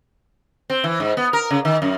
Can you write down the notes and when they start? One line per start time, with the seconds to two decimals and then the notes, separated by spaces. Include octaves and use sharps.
0.70 C4
0.84 E3
1.00 G#2
1.17 B3
1.33 A#4
1.51 C#3
1.65 D#3
1.82 F#2